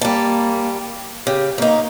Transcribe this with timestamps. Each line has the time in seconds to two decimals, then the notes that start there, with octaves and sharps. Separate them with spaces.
0.01 G3 A#3 A5
1.27 C#3 G4
1.58 C#3 A#3 D#4